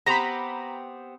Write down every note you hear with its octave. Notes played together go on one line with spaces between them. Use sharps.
B3 C4 G4 A#5 B5